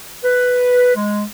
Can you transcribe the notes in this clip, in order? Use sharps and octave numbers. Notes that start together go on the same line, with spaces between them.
B4
G#3